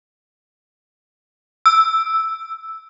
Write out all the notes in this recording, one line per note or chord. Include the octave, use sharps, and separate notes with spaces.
E6